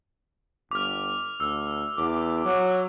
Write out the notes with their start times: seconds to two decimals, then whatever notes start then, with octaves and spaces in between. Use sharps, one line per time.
0.71 G1 D6 F6
1.40 D2 E6
1.97 E2 D6
2.45 F#3